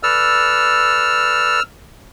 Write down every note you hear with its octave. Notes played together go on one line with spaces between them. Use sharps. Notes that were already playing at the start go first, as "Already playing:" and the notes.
A4 B4 D5 E6 F6